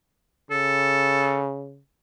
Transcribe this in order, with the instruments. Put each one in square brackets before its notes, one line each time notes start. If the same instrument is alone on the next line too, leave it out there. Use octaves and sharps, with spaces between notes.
[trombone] C#3 [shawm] A4